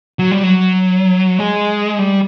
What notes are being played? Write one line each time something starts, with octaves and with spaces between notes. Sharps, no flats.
F#3
G3
F#3
G#3
G3